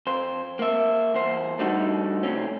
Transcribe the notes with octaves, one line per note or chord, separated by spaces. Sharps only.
F2 C5
A#3 E5
E2 C5
F3 G3 A3 D4 D#4 F#4
A2 C3 C4 C#4